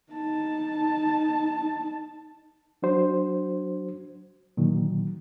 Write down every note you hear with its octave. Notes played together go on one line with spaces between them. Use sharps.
D#4 A5
F#3 D4 F#4 C5
A#2 D3 D#3 F#3